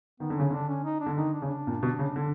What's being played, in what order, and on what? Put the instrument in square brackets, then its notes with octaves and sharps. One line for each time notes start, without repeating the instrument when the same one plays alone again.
[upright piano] D#3 [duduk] B3
[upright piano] D3
[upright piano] C#3 [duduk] C#4
[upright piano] D3 [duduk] D4
[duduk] C#4
D#4
D4
[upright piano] D3
[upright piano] D#3 [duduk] D#4
[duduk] D4
[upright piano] C#3 [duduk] C#4
[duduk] D4
[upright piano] A#2
B2
C#3
D3